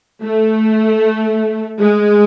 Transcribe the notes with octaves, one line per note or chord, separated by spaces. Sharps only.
A3
G#3